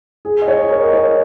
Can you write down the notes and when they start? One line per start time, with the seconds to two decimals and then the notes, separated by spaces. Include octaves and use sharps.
0.25 G#4
0.42 D#5
0.48 C#5
0.70 A#4
0.83 D#5
0.93 C#5